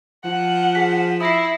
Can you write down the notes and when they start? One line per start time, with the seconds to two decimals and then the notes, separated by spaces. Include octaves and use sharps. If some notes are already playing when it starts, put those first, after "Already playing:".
0.25 F3 F#5
0.75 G#4 G#5 B6
1.21 E4 D#6 A#6 C7